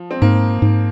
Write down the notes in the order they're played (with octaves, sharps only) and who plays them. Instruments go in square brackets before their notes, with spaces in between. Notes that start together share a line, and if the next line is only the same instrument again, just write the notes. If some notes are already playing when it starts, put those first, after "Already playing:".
Already playing: [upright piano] F3
C4
[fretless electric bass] G#2 [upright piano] A#3
[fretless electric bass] G#2